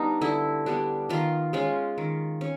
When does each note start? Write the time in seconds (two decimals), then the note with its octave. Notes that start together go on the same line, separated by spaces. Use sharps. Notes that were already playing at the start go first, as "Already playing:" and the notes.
Already playing: G3 B3 D4 D#4
0.21 D3 E4
0.66 G3 B3 D4
1.09 D#3 F4
1.53 G#3 C#4 F4
1.98 D#3
2.41 C#4